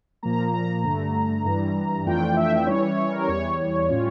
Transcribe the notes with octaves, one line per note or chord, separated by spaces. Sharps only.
A#2 F3 A#3 A#5
A#5
G2 D3 A3
G2 E3 G3
F2 E3 A3 D4 F4 G5
E5
E3 G3 C#4 E4 C#5
C#5
C#5
A#4
E2 E3 G3 C#5
A2 G3 C#4 F4